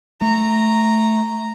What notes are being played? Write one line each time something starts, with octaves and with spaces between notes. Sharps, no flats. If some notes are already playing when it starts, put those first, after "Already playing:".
A3 A#5